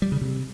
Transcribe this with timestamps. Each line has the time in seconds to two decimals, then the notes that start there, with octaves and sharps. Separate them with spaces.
0.02 G3
0.12 C#3
0.21 C3